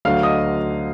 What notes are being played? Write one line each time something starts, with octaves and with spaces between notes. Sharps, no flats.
D2 D3 F#3 F5 F6
D#5 D#6